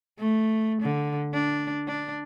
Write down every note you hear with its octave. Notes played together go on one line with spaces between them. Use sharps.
A3
D3
D4
D4